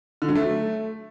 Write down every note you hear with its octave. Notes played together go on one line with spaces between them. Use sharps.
D3
F#3
A3